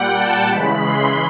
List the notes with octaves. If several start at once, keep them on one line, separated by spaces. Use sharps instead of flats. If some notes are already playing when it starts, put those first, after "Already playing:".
Already playing: A#2 G3 F#5 G5
A5
C#3 E3 G#3 B5
C6